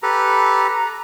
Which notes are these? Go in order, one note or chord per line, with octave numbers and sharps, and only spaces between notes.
G4 A4 B4 A#5